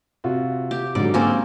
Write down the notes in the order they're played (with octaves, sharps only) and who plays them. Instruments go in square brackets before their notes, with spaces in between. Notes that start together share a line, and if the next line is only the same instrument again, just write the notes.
[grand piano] C3 F4 F#4
[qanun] G4
[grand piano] G#2 D3 F#3 [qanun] D5
[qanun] A#3 C4 C#4